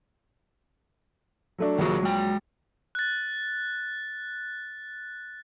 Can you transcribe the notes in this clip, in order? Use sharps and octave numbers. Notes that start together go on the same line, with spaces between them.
F#3 A3 D4
A#1 D#3 F#3 G4 G#4 C#6
G#3 G5
F#6 A6